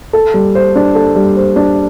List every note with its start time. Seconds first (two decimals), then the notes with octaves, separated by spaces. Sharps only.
0.13 A4
0.34 G3
0.55 C5
0.76 D4
0.95 A4
1.16 G3
1.37 C5
1.56 D4